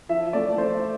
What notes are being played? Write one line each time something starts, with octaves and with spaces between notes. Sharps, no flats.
F3 E5
A3 D5
A3 C5